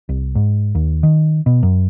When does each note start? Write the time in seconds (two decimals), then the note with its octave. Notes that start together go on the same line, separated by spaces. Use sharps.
0.09 C2
0.35 G#2
0.75 D#2
1.03 D#3
1.46 B2
1.63 F#2